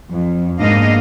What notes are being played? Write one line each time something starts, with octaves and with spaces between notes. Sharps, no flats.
F2
G#2 A#3 B3 D4 D#5 F5